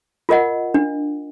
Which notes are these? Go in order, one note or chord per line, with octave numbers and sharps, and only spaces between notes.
F4 A#4 D#5 F#5
D4